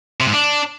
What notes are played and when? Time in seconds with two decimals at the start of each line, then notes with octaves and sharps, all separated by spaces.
0.20 C3
0.27 G#2
0.33 D4